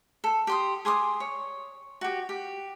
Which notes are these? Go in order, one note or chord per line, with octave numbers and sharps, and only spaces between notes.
A4
G4 C6 D#6
G#4 C6 D6 D#6
C#5
F#4 G4
G4